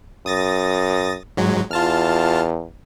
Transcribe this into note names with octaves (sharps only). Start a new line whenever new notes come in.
F#2 D#6 A6 A#6
G#2 F#3 G#3
E2 F4 A5 F6